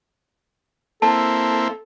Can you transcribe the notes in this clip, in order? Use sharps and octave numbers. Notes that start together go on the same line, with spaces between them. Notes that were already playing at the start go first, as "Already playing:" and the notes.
A#3 C4 E4 A4 A5